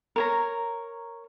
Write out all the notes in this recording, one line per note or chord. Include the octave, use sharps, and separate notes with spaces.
A#4 C#5 A#5